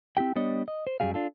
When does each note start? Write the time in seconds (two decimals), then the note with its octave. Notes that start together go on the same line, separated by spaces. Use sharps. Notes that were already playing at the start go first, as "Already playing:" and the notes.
0.17 C4 E4 G4 G5
0.36 G3 B3 D4 C#5 D#5
0.68 D#5
0.87 C5
1.00 F#2 F#3 G3 G#4 F5
1.14 D4 F4 A4